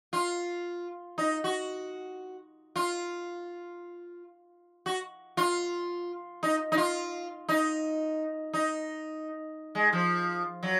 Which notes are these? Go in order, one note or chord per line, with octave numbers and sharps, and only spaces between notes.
F4
D#4
F#4
F4
F#4
F4
D#4
D#4
F4
D#4
D#4
G#3
F3
F#3